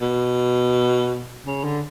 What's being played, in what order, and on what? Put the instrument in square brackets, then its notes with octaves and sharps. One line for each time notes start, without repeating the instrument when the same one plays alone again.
[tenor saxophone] B2
C#3
D3